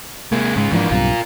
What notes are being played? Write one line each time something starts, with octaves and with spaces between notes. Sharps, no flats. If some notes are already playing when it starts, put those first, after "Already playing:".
C3 G#3 A#3
G#2 C#3 G#3
G#2 E3 F3 A#3 D4
B1 G2 C3 F4 A#4